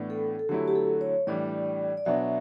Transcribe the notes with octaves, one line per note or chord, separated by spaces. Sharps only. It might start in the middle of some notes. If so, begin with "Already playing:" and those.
Already playing: A2 E3 B3 D4
A4
A4
D3 F#3 A3 E4 G4
G4
A4
C#5
A2 E3 G3 D4 D5
D5
B2 F#3 B3 D4 E5